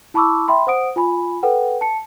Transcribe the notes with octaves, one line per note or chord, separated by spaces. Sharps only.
E4 A5 B5 C#6 D6 E6
E5 G5 B5 C6
C5 F#5 D#6 D7
F4 G#5 B5
A4 B4 F#5 G5
A5 C#7